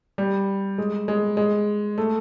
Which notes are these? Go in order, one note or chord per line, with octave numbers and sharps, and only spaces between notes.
G3
G#3
G#3
G#3
A3